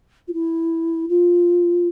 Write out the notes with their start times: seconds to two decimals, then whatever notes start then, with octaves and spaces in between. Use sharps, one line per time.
0.28 F4
0.33 E4
1.09 F4